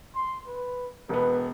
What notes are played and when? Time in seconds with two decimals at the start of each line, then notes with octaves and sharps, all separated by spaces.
0.15 C6
0.47 B4
1.09 E1 B3 B4